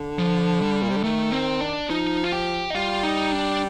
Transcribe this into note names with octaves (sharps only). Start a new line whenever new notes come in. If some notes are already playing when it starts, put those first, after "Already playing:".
Already playing: D3
F3
G3
A#2
C3
D3
D#3 A3
C4
D4
F3 D#4
F4
G4
D#4
G3 F4
D#4
D4